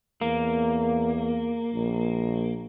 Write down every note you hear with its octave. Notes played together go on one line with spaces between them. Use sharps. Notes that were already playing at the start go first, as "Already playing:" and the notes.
E2 A#3
A#1